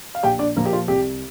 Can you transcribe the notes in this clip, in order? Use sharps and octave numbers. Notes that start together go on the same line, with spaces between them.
F5
A#1 G4 G5
D4 D5
A#2 F3 A#3 A#4
G4
F4
C2 G4